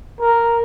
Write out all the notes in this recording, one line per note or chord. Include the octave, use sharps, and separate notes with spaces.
A#4